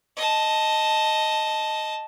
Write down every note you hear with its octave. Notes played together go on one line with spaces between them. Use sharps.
D#5 A5